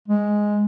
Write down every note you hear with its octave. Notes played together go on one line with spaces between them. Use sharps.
G#3